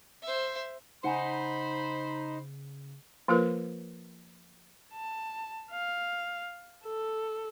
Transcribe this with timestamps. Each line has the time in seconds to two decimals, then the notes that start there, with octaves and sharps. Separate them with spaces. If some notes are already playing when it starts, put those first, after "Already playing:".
0.22 C5 E5
1.04 C#3 D#4 C5 F#5 G#5 B5
3.28 F3 A#3 F4 A#4 B4
4.93 A5
5.71 F5
6.84 A4